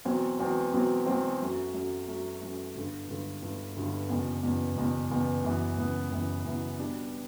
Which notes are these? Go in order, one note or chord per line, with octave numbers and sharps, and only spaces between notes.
E2 B2 F#3 C4
E2 B2 F#3 C4
E2 B2 F#3 C4
E2 B2 F#3 C4
F#2 F#3 A3
F#2 F#3 A3
F#2 F#3 A3
F#2 F#3 A3
G1 G2 D3
G1 G2 D3
G1 G2 D3
G1 G2 D3
F#1 E2 B2
F#1 E2 B2
F#1 E2 B2
F#1 E2 B2
F#1 F#2 E3 B3
F#1 F#2 E3 B3
F#1 F#2 E3 B3
F#1 F#2 E3 B3
B2 G3 B3 D4